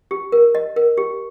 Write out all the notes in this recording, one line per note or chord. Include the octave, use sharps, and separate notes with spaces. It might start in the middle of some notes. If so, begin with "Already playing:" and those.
G4
A#4
D#5
A#4
G4